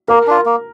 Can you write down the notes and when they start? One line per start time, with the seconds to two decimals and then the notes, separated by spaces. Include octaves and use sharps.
0.08 A#3 A#4
0.27 D4 F4
0.46 A#3